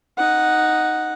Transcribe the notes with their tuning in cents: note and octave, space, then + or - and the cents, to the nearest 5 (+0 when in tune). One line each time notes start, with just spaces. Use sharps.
D#4 +0 F#5 +0